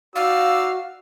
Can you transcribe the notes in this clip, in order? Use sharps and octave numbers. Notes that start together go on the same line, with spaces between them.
D#4 F#4 D5 F5 E6